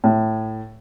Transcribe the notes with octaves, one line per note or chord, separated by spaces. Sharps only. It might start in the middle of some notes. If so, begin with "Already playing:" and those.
A2